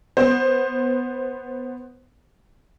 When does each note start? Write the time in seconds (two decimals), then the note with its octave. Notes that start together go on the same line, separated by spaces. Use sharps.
0.17 B3 C5